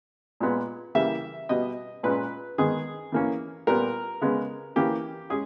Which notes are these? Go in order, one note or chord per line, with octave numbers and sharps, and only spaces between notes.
A#2 G#3 B3
C#3 E3 G3 A#3 E5
B2 G3 B3 D#5
A#2 G#3 C#4 B4
D#3 G#3 B3 G#4
E3 A#3 C#4
A#2 G3 B3 A#4
C#3 G#3 B3
E3 A#3 C#4 G4
G#3 C#4 G#4